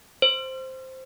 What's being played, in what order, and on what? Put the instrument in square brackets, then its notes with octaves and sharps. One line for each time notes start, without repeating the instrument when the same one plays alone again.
[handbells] C5